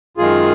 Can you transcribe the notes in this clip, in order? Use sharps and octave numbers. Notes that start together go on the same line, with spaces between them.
F#2 D#3 G#3 F4 G#4